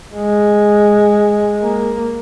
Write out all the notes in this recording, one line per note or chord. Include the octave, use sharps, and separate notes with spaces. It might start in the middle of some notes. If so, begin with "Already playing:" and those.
G#3
A#3